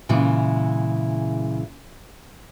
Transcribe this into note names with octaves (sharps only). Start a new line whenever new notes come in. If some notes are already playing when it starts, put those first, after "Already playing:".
A#2 C#3 E3 G#3 E4